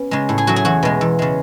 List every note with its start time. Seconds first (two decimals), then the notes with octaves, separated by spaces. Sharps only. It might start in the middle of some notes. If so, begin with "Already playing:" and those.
Already playing: B3 C#4
0.11 C#3 G#3
0.29 A2
0.38 G#4
0.47 F#3 A3 F#4
0.56 G#4
0.65 E2 F#4
0.83 B2 G#3
1.01 E2
1.19 C#3 G#3